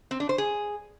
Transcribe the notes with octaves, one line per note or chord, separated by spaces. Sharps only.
C4
D4
C5
G#4